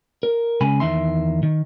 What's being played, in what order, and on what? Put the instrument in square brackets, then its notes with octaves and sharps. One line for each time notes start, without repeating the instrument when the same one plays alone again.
[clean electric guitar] A#4
C#3 G#3 G#5 B5
E2 D#3 E5 C6
D#3